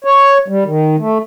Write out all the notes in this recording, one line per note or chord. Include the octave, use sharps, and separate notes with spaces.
C#5
G3
D#3
A3